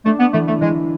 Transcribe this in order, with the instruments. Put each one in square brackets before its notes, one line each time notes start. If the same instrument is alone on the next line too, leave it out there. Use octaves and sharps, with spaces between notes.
[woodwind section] A3 [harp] D4
[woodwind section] B3
[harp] E3 [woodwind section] A3
[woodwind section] A3
[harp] E3 [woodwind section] G#3